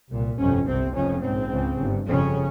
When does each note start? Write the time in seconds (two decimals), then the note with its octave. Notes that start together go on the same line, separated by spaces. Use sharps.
0.10 C2 A#2
0.37 G1 F2 C3 C#4
0.66 C2 C3 C4
0.95 F1 F2 C#3 C#4
1.22 A#1 G#2 C4
1.52 C#2 C#3
1.79 G1 G2
2.07 G1 F2 C#3 C#4